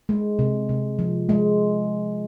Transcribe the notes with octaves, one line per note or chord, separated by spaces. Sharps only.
G#3
C3
C3
F3
G#3